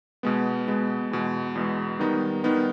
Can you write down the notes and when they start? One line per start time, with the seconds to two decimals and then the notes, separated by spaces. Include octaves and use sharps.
0.23 B2 G#3 B3
0.68 B2 G#3 B3
1.11 E2 B2 G#3
1.55 E2 B2 G#3
1.99 D#3 G3 B3 D#4
2.44 D#3 G3 B3 D#4